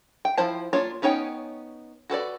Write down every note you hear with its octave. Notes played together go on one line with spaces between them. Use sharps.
G5
F3 E4 C5 A5
A#3 D4 F4 C#5
B3 C#4 D#4 C#5 G5
F#4 A4 B4 D5